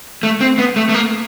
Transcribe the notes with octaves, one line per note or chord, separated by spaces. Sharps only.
A3
C4
B3
A3
A3
A#3